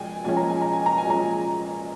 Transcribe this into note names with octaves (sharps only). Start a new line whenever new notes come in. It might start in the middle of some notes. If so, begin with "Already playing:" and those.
Already playing: A#2 F3 G#3 G5 G#5
A#2 F3 G#3 C#4 G#5
A#5
G#5
A#5
G#5
A#5
G#5
A#2 F3 G#3 C#4 A#5